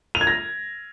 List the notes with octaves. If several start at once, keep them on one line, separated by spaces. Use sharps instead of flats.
F7
G#6
A#6